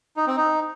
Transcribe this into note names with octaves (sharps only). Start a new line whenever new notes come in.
D#4
C4
D#4